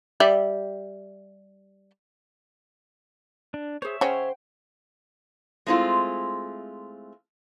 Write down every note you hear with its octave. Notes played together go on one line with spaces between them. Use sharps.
G3 D5 E5
D4
G#4 C5 C#5 E5
C#3 C#4 C5 F#5 G5
G#3 A3 C4 E4 F4